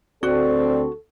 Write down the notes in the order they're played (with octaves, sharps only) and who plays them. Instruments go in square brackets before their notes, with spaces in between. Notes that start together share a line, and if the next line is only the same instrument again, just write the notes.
[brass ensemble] D2 C4 [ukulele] F#4 [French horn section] A4 [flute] D5